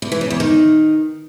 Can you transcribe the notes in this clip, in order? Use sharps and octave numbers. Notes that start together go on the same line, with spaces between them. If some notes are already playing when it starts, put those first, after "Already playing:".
E2
E3
C#3
E2
D#3